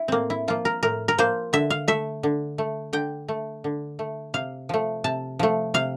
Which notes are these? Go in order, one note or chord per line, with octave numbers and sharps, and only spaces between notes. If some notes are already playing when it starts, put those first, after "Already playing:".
Already playing: E4
A2 A#3 C4
E4
F3 A#3 F4
A#4
A2 A#4
A#4
F3 A#3 C5
D3 E5
F5
A3 E5
D3
A3
D3 G5
A3
D3
A3
C3 F5
F3 A3
C3 A5
F3 A3
C3 F5